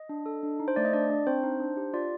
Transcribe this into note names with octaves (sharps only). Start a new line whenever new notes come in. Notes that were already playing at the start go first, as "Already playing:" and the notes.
Already playing: D#5
D4
A4
D4
D#4
C5
A3 D5
D#5
D4 D5
D4
C4 C5
D#4
D4
G4
F4 D5